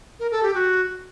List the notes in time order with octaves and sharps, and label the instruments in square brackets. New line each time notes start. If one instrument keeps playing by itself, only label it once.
[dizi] A#4
A4
G4
F#4